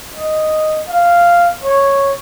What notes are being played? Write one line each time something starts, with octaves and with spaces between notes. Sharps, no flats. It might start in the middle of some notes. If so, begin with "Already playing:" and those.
D#5
F5
C#5